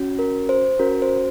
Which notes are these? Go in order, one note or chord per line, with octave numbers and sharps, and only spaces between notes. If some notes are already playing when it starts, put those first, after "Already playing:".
Already playing: C#4 F#4
A#4
C5
C#4 F#4 A#4
C5